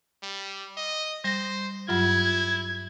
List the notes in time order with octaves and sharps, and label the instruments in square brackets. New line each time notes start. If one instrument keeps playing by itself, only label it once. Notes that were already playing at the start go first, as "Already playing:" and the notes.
[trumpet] G3
D#5
[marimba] G3 A#6 [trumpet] C5
[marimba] G2 F#3 F4 [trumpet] E4 [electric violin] G#6